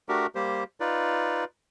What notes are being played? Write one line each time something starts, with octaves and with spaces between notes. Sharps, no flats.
A3 D4 F#4 G4 A#4
G3 A#3 G4 C5
D#4 F4 B4 D5